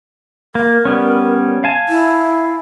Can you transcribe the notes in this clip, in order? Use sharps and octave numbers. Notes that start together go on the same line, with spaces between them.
A#3 A#4
G3 B3 C#4
F5 G#5 A5
E4